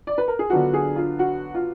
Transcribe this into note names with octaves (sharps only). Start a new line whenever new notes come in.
D5
B4
A#4
G#4
D3 F#3 B3 D4 F4 F#4
G#4
F4
F#4
F4